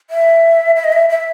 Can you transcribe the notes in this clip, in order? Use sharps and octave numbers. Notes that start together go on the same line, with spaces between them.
E5
E5
D#5
E5
E5